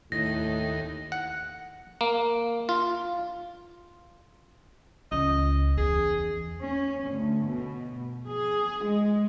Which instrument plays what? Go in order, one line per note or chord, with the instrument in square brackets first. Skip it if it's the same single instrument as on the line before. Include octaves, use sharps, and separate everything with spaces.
[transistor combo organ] D#2 [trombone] A2 [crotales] A#6
[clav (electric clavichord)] F#5
A#3
F4
[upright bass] C#2 [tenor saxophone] D#5
[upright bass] E2 [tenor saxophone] G#4
[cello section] C#4
D2
B2
G#4
G#3